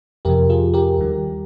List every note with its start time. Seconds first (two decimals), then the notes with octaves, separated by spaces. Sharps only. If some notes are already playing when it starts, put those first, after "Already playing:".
0.25 F2 C3 F3 G4 A#4
0.50 F4 G#4
0.74 G4 A#4
0.99 D#2 D#3 G3